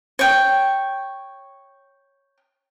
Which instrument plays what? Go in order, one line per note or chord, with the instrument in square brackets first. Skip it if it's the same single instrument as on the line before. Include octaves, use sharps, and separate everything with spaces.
[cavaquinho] C#5 G5